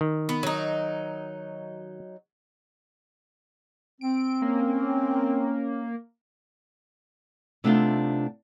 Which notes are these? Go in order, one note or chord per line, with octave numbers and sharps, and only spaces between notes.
D#3
B3
F#3 D#4
C4 D7
A#3 C#4
C3 A3 B3 D4 D#4 F4